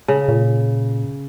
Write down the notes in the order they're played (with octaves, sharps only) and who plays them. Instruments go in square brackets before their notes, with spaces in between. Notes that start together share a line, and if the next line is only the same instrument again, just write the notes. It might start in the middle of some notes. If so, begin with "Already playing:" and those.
[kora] C#3
[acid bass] A#2